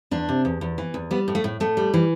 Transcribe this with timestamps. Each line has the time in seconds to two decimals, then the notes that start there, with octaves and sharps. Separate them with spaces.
0.11 E2 D4
0.29 C3
0.45 E2
0.61 E2
0.78 E3
0.94 E2
1.11 G3 B3
1.28 A2
1.35 A3
1.44 A2
1.60 A2 A3
1.77 G3
1.94 E3